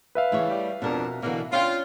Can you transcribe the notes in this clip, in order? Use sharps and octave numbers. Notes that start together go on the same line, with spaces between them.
B4 E5 F5
C#3 E3 A3 E4 C#5
G3
F2 B2 D4 A#4
B2 D3 E3 A#3
C#4 D4 F4 G5